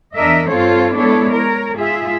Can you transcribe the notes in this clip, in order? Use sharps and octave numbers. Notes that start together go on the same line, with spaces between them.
E2 D4 A#4 D#5 E5
G2 C4 F4 A4 C5 C#5
G#3 B3 D4 E4 A4 C#5
A#4 C#5
G#2 F4 G#4 E5